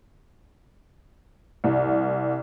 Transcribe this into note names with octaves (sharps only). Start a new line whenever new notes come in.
C2